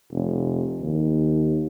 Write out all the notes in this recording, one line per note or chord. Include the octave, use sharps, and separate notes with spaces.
F1
D#2